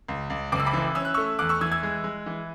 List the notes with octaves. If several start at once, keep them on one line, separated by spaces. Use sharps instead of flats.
C#2
C#2
F#1 D6
E6
B5 D6
E3
C#4 E6
F#6
A3 C#6 E6
E2 D6 F#6
C#6 E6
E3 E6 G#6
E6 G#6
G#3
G#3
E3